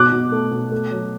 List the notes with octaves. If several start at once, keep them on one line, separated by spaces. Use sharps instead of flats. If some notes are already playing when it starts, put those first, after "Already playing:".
Already playing: B2 D6 F#6
B2
A3
B2
A3
F#3